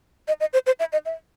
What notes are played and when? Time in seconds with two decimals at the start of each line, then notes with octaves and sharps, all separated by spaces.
0.28 D#5
0.40 D#5
0.53 C5
0.67 C5
0.80 E5
0.93 D#5
1.06 E5